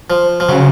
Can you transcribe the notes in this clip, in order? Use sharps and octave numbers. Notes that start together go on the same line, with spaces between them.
F3
F3
C#3 F#3